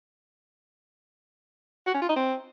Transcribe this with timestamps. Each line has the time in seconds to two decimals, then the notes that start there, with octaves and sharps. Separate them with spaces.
1.87 F#4
1.94 C#4
2.01 F4
2.09 D#4
2.16 C4